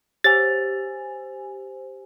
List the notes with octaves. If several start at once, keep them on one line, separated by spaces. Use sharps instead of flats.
G4 C5 G#5 A6